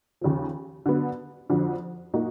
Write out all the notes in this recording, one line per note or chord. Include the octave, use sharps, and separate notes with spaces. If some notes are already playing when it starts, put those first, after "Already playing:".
D#2 C#3 F3
D3 F#3 B3
F2 D3 F#3
A#2 F#3 A#3 D#4 F#4